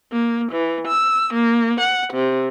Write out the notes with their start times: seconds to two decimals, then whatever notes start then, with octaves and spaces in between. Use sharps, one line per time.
0.12 A#3
0.51 E3
0.87 E6
1.33 A#3
1.80 F#5
2.14 C3